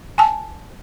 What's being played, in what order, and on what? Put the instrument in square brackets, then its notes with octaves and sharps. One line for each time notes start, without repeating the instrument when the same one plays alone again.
[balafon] G#5 A5